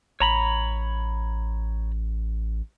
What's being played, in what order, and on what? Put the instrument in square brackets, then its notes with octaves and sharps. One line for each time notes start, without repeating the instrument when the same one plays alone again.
[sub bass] A1 [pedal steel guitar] C#5 A#5 B5